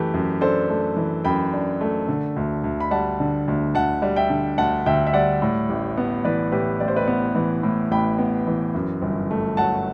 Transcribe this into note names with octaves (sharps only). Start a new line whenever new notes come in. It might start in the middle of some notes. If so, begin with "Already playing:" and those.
Already playing: F#2 E3 A3 G4 B4
F#2
D4 A4 C5
A3
E3
F#2 G5 B5
D4
A3
D3
D2
D2
B5
G3 F#5 A5
D3
D2
D2 F#5 A5
G3
E5 G5
D3
D2 F#5 A5
D2 E5 G5
E5
G3 D5 F#5
A2
A1
B3
E3 B4 D5
A2 G4 B4
A1 D5
C5
B4 D5
B3
E3
A2
A1 G5 B5
B3
E3
F#2
G1
A3
F#3 F#5 A5